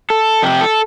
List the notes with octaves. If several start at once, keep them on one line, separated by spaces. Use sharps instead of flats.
A4
F2 C3 G4
A4